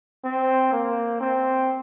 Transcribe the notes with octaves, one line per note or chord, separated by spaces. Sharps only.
C4
A#3
C4